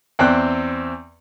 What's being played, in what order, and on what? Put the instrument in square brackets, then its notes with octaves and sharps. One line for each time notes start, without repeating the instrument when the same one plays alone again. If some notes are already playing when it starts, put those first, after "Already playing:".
[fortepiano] E2 C4 D5 G5 F#6